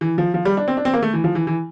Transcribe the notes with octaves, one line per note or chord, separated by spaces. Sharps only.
E3
F3
F3
G3
D4
C4
D4
C4
A#3
A3
E3
F3
E3
E3